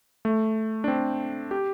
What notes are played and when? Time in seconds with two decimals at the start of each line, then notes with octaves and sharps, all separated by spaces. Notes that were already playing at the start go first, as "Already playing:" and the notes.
0.25 A3
0.84 D4
0.88 C4
1.51 G4